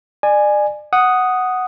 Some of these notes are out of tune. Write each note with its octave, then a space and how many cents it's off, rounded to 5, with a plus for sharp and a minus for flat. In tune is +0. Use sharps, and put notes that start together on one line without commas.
D5 +35 G#5 +0
F#5 +0 D#6 +0